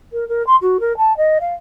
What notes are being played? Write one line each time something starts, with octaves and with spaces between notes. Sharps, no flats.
A#4
A#4
C6
F#4
A#4
A5
D#5
F5